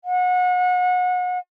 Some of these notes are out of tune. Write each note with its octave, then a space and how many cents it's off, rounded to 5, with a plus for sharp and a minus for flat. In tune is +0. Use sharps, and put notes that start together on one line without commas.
F#5 -30